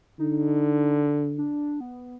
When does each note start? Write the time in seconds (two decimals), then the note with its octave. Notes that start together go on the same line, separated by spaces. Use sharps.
0.19 D3 D#4
1.38 D4
1.80 B3